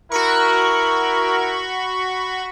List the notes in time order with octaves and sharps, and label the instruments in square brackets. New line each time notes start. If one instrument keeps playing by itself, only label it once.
[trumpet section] E4 A#4 [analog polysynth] F#4 B5 C#6